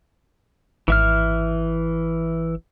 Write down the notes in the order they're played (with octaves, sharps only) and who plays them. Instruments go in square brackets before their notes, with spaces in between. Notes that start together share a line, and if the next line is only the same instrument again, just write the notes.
[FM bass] G#1 [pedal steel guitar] E3 E5 F6